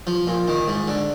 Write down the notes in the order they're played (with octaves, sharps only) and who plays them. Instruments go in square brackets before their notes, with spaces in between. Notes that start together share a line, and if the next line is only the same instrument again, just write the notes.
[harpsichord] F3
A#2
D#3
G#2
D3